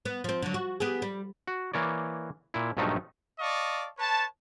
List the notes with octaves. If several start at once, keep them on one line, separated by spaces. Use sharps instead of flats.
B3
F3 C4
D3 F#3
F#4
B3 G4 G#4
G3
F#4
E3 A#3 C#5 D5
A#2 E4
A#1 G2 F3 F#3 A3 D#4
D5 D#5 F5 A5 C#6
B4 C#5 A5